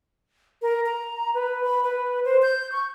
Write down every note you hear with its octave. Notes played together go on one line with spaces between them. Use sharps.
A#4
A#5
B4
B5
B4
C5
G6
C#6